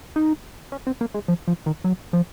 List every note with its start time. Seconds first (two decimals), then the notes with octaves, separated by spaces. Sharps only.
0.16 D#4
0.72 C#4
0.87 C4
1.01 A#3
1.14 G#3
1.28 F3
1.47 F3
1.66 D#3
1.84 F#3
2.13 F3